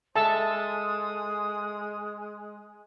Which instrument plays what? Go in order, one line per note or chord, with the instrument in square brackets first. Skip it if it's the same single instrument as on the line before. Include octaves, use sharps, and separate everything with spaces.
[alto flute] G#3 [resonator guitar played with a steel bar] A4 E5 [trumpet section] C5 D#6 [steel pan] A5 E6